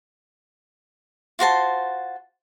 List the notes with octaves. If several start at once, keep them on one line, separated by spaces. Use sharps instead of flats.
F4 F#4 C5 A5